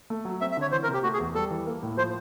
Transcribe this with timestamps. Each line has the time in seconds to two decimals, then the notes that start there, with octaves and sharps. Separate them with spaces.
0.10 A3
0.25 F#3
0.41 C4 E5
0.52 E5
0.57 D3 C#5
0.72 E3 C5
0.83 A#4
0.88 C3
0.94 G4
1.03 A3 F#4
1.14 G#4
1.19 E2
1.35 G3 A4
1.51 E3
1.66 A#3
1.83 A2
1.97 F3 C5